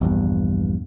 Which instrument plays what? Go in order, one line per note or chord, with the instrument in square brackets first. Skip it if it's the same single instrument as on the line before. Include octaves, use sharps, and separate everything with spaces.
[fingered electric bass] A#1 E2 G2